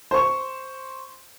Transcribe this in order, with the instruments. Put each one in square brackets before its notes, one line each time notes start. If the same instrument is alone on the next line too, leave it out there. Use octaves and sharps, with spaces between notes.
[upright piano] C5 C#6